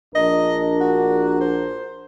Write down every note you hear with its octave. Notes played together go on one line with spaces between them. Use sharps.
A#1 D4 A#4 D#5
F#4
C5